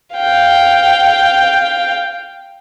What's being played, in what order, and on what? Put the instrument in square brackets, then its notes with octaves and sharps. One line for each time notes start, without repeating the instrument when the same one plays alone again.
[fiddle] F5 G5